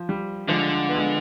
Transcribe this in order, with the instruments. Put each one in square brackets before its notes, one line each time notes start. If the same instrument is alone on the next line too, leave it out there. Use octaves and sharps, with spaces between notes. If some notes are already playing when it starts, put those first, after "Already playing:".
Already playing: [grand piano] F3
G3
[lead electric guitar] D3 [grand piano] F3 G#3
[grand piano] B3
G#3